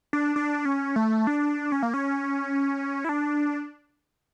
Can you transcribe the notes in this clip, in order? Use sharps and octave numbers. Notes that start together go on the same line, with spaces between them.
D4
D4
C#4
A3
D4
C#4
A#3
C#4
E4
D4